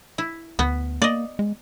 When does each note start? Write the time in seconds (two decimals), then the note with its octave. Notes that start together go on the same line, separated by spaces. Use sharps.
0.18 E4
0.59 D2 B3
1.02 A#3 D5 D#5
1.39 G#3